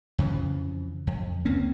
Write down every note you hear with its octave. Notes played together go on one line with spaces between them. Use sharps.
F2 C#3 E3 F3
F2
C#2 A#3 C4 C#4